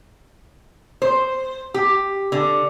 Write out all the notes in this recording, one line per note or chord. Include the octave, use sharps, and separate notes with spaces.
C5
G4
D3